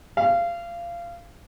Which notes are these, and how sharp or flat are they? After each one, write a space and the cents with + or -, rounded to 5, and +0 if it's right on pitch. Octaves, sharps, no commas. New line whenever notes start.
F5 -25